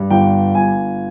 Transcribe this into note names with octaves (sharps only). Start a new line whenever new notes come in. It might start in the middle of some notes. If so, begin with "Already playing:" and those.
Already playing: G2
G1 G5
G1 G#5